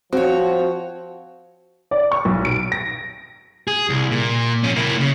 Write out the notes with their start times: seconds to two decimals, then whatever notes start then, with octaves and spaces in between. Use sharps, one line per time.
0.13 F3 C4 F#4 C#5
1.91 D5
2.12 C#6
2.25 B1
2.45 D7
2.72 A#6
3.68 G#4
3.89 C2
4.11 A#2
4.64 F3 C#4
4.76 A#3 E4
4.99 C#3